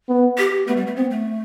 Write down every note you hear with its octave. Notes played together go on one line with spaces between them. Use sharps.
B3
G4
A3 B3
G3
A3
B3 C4
A3